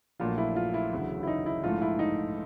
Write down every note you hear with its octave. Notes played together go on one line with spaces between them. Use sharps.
A#1 A#2 F#3 A3 F4
E4
F4
E4
E1 D2 C#3 F#3
E4
D#4
E4
A#1 G#2 E3 A3 F4
E4
D#4